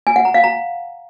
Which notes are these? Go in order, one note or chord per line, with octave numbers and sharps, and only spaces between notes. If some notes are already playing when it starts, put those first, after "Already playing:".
G#5
F#5
A#5
F5
A#5